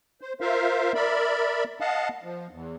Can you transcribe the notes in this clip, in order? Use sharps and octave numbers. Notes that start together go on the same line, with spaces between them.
C5
F4 A#4 C5 E5 F5
A#4 D5 E5 B5
D#5 F5 F#5 A5
F3
E2